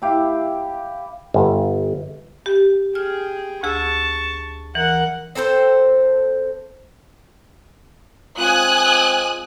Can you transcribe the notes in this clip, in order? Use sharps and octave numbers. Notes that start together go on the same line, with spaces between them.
E4 G4 F5
G1
G4
G#4 G5 F6
D2 G#4 A5 C#6 E6
E3 A#4 F#5
C4 A4 A#4 C5
G#3 C4 F4 G#5 D#6 F#6